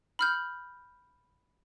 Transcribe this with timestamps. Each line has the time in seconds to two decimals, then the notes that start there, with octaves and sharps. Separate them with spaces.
0.19 B5 F6 G6